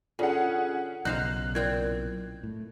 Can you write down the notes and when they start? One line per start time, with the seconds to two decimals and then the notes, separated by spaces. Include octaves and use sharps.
0.19 D3 C#4 F4 G#4 F#5
1.05 B1 C#3 D#4 C5 F5 F#6
1.55 A#2 C4 E4 G5 G#6
2.43 A2